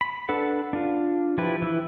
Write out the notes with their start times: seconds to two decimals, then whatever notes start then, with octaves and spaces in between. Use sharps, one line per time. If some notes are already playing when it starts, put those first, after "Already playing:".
0.01 B5
0.29 D4 A4 B4 F#5
0.73 D4 F4
1.38 F3 E4 G4 B4
1.62 E3 E4